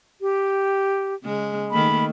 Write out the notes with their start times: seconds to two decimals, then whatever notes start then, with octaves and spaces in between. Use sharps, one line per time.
0.21 G4
1.22 C#3 G#3
1.71 D#3 A3 A#3 B5